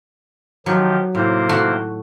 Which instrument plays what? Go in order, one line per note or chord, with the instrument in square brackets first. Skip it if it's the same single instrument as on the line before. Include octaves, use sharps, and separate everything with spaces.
[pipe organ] D#3 F3 G4 [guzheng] F#3
[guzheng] A2 [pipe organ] C3 A#3 C5
[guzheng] A3 F#4